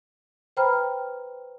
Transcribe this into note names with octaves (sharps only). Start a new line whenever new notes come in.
B4 C5 G5 A#5 B5 F6